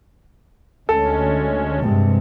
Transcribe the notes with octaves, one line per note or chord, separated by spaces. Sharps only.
D2 G#3 C#4 A4
G2 C3 G#3